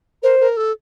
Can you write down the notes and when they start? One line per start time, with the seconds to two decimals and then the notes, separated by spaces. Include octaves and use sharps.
0.22 A#4 C5
0.40 A#4
0.57 A4